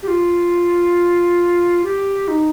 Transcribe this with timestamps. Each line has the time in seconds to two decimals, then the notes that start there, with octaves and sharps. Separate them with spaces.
0.03 G4
0.08 F4
1.84 G4
2.28 D#4